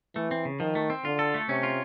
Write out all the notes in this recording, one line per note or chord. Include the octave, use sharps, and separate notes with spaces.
E3 A3
C4
C#3
D#3 F3
A3
C4
D3 F4
A4
A3
C3 C#4
F4